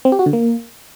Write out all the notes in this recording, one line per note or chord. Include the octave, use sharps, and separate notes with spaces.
C4
G4
F#4
D3
A#3